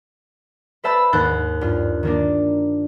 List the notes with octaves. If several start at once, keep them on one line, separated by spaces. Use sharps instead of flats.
B4 C5 E5 A5 B5
D#2 G#2 C5 F#6 A6
G2 F4
D#3 A#3 D4